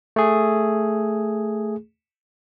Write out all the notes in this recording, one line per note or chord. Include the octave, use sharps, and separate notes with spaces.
A3 G#4